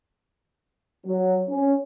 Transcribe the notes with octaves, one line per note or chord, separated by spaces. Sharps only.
F#3
C#4